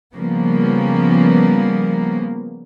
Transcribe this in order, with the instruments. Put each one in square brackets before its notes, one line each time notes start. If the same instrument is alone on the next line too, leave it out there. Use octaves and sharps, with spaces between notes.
[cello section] C#3 F3 G3 A#3 B3